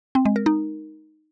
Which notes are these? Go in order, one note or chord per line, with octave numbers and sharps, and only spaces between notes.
C4
G#3
A#4
D#4